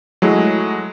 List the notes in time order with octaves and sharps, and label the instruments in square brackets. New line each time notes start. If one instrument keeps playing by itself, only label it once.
[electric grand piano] F#3 G#3 A3 E4